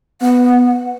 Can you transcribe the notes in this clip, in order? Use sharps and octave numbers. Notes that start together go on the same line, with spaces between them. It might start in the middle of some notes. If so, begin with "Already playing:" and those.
B3 F#5